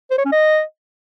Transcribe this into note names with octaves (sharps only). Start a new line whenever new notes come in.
C5
C#5
C#4
D#5